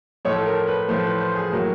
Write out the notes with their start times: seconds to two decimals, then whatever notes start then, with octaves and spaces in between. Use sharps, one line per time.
0.25 A2 F3 A3 C#5
0.36 A4
0.46 A#4
0.67 B4
0.89 A2 F3 A3 C5
1.05 B4
1.20 C5
1.36 G#4
1.52 A2 F#3 A#3